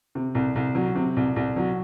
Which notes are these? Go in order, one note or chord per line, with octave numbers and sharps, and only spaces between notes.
C3
C2
C2
F#3
C3
C2
C2
F#3